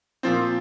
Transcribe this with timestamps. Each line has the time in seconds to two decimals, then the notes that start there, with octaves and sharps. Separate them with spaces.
0.23 A#2 F3 C4